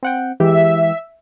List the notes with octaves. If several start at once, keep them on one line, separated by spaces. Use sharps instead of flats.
C4 F#5 G5
E3 G#3 G4 E5